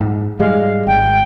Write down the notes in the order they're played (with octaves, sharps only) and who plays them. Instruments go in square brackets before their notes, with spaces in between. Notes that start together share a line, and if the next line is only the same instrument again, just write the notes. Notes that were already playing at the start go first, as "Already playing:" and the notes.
[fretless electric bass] G#2
[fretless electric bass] G#2 G3 G#3 [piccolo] F5
[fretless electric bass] G#1 [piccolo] G5